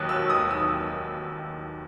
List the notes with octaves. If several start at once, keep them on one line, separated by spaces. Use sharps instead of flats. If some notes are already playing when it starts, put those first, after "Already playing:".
Already playing: D#2 D#3 F#3 D#6 F#6
E6
D#6
E6